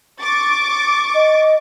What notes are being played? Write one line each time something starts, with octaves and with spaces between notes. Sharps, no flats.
C#6 D6 A6
D#5